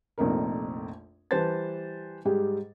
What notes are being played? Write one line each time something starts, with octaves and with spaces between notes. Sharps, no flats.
F1 A#1 F2 D#4 A#4
E3 G3 B4 C5 A5 A6
G#2 G3 G4 G#4